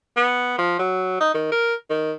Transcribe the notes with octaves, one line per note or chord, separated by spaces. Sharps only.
B3
F3
F#3
D#4
D#3
A#4
D#3